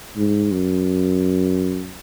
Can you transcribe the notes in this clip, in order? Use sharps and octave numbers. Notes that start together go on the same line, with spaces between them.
G#2
F#2